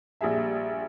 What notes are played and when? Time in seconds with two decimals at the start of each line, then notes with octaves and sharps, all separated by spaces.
0.21 A#1 G3 G#4 E5